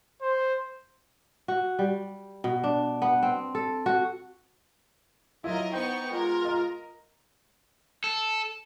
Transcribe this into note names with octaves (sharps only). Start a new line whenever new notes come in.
C5
F#4
G3
B2
D4
B3
C4
A4
F#4
F#3 E4 F4 A#4 D#5
B3 D#4 C5 G5 C#6
G#3 F4 A#4
D#5 A#5
A4